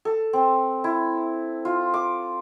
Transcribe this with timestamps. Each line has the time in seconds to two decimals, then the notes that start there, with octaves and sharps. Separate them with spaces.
0.05 A4
0.33 C4
0.84 E4
1.65 F4
1.94 D6